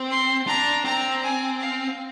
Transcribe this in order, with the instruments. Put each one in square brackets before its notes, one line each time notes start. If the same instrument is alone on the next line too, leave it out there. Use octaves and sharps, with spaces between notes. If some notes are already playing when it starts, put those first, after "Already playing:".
Already playing: [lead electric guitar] C4
[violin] C6
[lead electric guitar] D4 [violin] A#5
[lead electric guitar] C4 [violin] A#5
[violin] G#5
F5